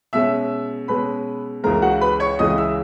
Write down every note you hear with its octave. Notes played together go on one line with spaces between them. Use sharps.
B2 G#3 C#4 E5 E6
B2 G#3 C#4 B4 B5
C#2 C#3 E3 G#3 A#4 A#5
F#4 F#5
B4 B5
C#5 C#6
C#2 C#3 E3 G#3 D#5 D#6
D#6
E5 E6